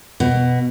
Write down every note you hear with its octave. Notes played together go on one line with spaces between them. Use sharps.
B2